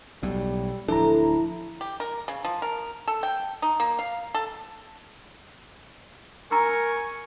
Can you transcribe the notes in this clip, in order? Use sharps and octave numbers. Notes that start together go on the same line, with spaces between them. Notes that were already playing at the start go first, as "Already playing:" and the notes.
B1 A2 G3
D1 F3 D4 E4 A4 A#5
G4
A#4
C#3
F3
A#4
A4
G5
D#4
A#3
F5
A4
A#4 G#5 A#5 C#6 E6